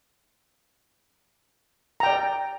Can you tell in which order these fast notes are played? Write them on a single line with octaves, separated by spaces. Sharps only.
A#5 G5 D5